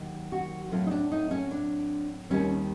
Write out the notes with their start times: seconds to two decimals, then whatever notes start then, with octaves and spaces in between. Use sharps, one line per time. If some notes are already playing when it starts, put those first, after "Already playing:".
Already playing: D#2 D#3 F#3
0.32 F#4
0.71 A2 F#3 A3 C4 F4
0.87 D#4
0.91 D4
1.12 D#4
1.31 C#4
1.51 D4
2.29 D#2 D#3 G3 C4 C#4